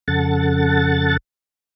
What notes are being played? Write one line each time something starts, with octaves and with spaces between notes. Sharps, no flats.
F2 C#3 A4 F#5 A6